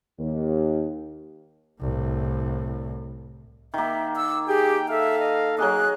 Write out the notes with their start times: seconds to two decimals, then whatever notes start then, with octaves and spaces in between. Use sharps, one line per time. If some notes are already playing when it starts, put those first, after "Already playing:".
0.19 D#2
1.81 C2 A2
3.74 D#3 A#3 E5
4.16 E6
4.48 G4 G#4 G5
4.89 A4 E5 F5
5.20 D#5
5.58 F#3 A#3 G#4 D#5 F#6